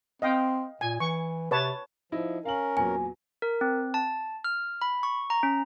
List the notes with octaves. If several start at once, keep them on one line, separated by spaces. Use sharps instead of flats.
C4 D#5 F5 G5
A#2 G#5
E3 C#6
C3 B4 C#5 A5
F3 D#4 E4 D#5
C#4 A#4 F5 F#7
E2 A#2 F#3 G#5
A#4
C4
A5
F6
B5
C#6
A#5
C#4